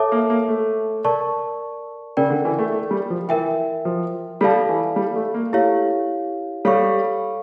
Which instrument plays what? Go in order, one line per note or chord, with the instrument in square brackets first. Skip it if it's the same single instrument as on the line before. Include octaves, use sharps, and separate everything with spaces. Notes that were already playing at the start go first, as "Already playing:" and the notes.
Already playing: [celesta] A4 C#5 E5 A5 D6
[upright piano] A#3
A#3
A3
[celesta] A#4 D5 A5 C#6
[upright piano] C#3 [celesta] A#4 D5 G5
[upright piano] D3
E3
A3
A3
G3
F3
[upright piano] E3 [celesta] A#4 E5 G5
[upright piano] F3
[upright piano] G3 [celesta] A4 D5 F5 A5
[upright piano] E3
G3
A3
A#3
[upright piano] A3 [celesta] E4 G4 C#5 F5
[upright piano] G3 [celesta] A4 C#5 F5 C#6